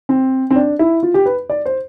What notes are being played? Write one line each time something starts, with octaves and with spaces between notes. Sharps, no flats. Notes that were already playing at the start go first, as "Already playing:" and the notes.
C4
C4
D4
E4
F4
G4
B4
D5
C5